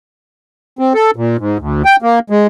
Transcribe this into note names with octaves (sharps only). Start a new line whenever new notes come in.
C4
A4
A#2
G#2
D2
G5
A#3
G#3